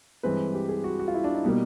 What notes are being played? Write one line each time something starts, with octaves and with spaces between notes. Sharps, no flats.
G2 E3 G#3 C4 B4
G4
G#4
F#4
F#4
F4
E4
D4
D#4
B2 G3 A#3